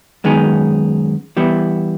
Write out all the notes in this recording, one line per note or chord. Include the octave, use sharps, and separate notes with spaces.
F#2 D#3 G#3 B3 D#4
E3 G3 B3 E4